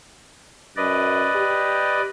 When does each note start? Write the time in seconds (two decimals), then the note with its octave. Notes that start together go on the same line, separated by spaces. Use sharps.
0.76 F#2 B4 D5 D#5
1.35 G4